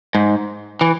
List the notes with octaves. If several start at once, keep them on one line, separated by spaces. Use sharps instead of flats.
G#2
E3